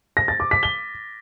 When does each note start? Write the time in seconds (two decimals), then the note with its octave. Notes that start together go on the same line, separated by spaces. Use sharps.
0.17 A#6
0.28 A6
0.40 D6
0.51 B6
0.63 G7